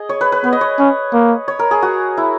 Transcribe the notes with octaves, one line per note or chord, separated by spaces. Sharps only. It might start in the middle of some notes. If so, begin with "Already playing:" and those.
Already playing: G#4 D#5
C#5
B4
B4
B3 B4
D#5
C#5
C#4
A#3
C#5
A#4
G#4
F#4
E4